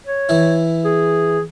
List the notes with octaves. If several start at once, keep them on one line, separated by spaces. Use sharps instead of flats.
C#5
E3 E4
G#4